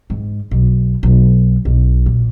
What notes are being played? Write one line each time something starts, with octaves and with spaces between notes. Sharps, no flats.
G#2
B1
B1
B1
A#2